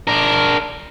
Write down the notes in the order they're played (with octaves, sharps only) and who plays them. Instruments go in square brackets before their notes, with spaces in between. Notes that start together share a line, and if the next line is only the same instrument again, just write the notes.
[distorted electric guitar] D4 A#4